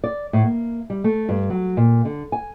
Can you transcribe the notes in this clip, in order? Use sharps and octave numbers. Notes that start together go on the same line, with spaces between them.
D5
A2
A#3
G3
A3
G2
F#3
A#2
D3
G#5